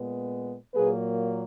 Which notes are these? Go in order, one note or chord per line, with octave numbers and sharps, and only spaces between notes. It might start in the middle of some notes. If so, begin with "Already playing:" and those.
Already playing: A#2 G#3 B3
A#2 F#3 A#3 G#4 B4